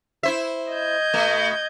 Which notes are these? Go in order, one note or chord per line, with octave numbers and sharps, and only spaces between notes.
E4 C5 E5
D#5 G6 G#6
B2 A3